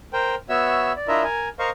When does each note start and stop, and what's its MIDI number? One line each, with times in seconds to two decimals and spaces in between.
0.13 0.35 70
0.13 0.35 72
0.13 0.35 79
0.49 0.92 59
0.49 0.92 66
0.49 0.92 73
0.49 0.92 76
0.49 0.92 88
0.96 1.08 74
1.08 1.24 62
1.08 1.24 64
1.08 1.24 65
1.08 1.24 70
1.08 1.24 75
1.08 1.24 76
1.24 1.49 70
1.24 1.49 80
1.59 1.70 70
1.59 1.70 72
1.59 1.70 75
1.59 1.70 77
1.59 1.70 85